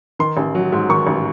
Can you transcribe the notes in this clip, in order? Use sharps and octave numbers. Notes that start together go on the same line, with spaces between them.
D#3 C6
A1
F#3
G#2
D#3 C#6
A1